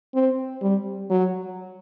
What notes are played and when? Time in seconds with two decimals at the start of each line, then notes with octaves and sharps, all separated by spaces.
0.14 C4
0.61 G3
1.10 F#3